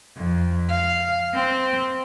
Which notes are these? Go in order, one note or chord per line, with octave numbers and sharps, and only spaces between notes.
F2
F5
C4